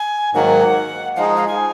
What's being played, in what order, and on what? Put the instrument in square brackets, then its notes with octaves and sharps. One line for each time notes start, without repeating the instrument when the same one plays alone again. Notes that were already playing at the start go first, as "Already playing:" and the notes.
Already playing: [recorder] G#5
[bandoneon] G#2 D#3 F#3 A#3 [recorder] F#5
[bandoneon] F3 G#3 D#4 G#4 [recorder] F5
[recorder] F5
G#5